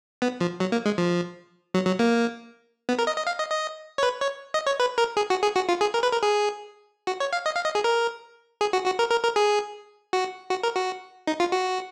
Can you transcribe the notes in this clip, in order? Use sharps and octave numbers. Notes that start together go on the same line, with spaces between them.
B3
F3
F#3
A#3
G#3
F3
F#3
F#3
A#3
B3
A#4
D#5
D#5
F5
D#5
D#5
C#5
B4
C#5
D#5
C#5
B4
A#4
G#4
F#4
G#4
F#4
F4
G#4
A#4
B4
A#4
G#4
F#4
C#5
F5
D#5
F5
D#5
G#4
A#4
G#4
F#4
F#4
A#4
A#4
A#4
G#4
F#4
F#4
A#4
F#4
D#4
F4
F#4